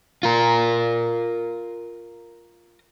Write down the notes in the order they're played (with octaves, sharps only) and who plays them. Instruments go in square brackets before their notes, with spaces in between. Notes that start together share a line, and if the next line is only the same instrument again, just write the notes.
[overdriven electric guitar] F4 A#4